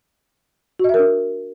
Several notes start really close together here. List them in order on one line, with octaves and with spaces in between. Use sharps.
F#4 D#5 E5 A#4 D4